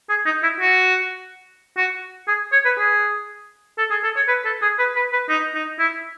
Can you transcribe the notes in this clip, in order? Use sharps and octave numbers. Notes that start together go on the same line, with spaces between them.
G#4
D#4
E4
F#4
F#4
G#4
C#5
B4
G#4
A4
G#4
A4
C#5
B4
A4
G#4
B4
B4
B4
D#4
D#4
E4